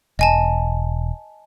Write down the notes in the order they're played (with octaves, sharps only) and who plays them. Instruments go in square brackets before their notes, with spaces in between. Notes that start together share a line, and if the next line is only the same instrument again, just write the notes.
[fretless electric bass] E1 [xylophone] D#5 G#5 A5